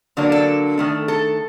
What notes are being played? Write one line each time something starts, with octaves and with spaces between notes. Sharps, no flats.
D3 F#3 A#3 D4
A4
D#3 A3 D4
A4